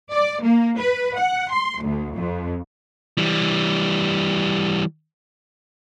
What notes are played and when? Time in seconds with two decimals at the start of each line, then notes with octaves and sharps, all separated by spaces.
0.13 D5
0.44 A#3
0.79 B4
1.18 F#5
1.50 C6
1.81 D2
2.16 F2
3.18 E3 G3